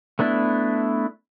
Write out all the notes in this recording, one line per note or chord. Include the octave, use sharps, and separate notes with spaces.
A3 B3 D4 E4